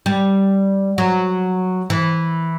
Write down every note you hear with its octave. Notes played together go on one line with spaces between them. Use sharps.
G3
F#3
E3